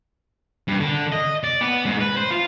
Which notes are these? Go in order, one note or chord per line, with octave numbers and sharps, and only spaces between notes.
G2
D3
D#5
D5
B3
G#2
B4
C5
F4